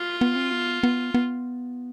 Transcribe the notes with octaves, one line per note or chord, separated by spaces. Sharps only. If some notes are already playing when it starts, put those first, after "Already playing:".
Already playing: F4
B3
C4
B3
B3
B3